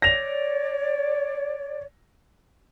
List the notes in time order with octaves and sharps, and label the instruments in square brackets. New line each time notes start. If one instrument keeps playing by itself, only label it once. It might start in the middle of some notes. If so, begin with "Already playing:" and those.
[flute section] C#5 D5 [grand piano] A#6 F7